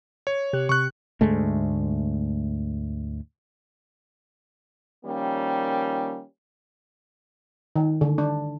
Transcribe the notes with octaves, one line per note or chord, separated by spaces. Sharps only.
C#5
C3 G4 F#6
C3 C#6 F#6
D2 G#2 G#3 A3
D#3 F3 G3 A#3 C#4
D#3
D3
D4